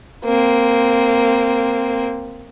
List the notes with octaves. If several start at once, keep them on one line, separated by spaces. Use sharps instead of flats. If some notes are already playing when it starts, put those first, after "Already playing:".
A#3 C4